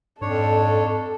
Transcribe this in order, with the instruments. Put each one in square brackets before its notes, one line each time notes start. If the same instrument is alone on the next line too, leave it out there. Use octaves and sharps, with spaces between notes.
[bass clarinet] F2 [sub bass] G#2 [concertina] D4 C#5 [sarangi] A4